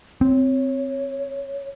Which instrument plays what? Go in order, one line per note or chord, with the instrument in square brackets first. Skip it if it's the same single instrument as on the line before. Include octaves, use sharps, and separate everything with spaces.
[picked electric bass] C4 [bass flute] C#5